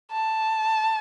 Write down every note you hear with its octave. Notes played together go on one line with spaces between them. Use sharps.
A5